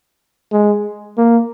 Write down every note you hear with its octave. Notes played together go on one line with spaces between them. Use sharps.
G#3
A#3